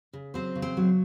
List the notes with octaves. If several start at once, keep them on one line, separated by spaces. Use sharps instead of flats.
C#3
F#3 C4 C5
C#3
C4 C5
F#3